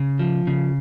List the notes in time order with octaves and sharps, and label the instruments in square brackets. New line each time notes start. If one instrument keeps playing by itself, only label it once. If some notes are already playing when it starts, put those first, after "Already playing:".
Already playing: [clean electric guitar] C#3
F3
C#3